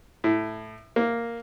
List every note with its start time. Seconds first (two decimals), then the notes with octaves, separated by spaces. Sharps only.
0.24 A2
0.96 A#3